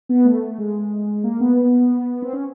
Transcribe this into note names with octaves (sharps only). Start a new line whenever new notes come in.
B3
A3
G#3
A#3
B3
C4
C#4